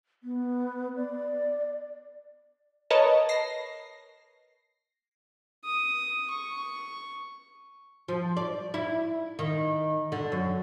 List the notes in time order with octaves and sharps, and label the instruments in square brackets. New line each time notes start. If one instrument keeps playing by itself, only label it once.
[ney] B3
D5
[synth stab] A#4 B4 C#5 D#5 A5
A#6 C7
[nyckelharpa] D#6
C#6
[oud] F3
D5
E4
D#3
D3
F#2